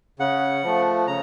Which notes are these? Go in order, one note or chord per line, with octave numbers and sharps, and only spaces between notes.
C#3 F#5
F3 A3
C#3 A#5